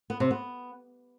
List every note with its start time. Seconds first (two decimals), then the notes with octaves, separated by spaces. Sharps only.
0.10 B3
0.20 C3
0.31 B3